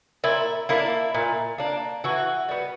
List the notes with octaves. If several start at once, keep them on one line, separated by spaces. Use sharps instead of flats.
A#2 E4
A#3 D4 E4
A#2
A#3 D4
E3 F#4
G3 B3